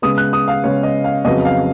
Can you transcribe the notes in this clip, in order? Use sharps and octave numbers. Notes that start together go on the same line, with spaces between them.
C#3 G#3 B3 D#6
F#6
D#6
F5
C#3 G#3 B3 C#5
D#5
F5
F2 C#3 F#3 B3 D#5
F5